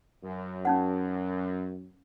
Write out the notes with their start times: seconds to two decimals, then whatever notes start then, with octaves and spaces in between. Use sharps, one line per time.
0.23 F#2
0.65 C#4 D#4 F#5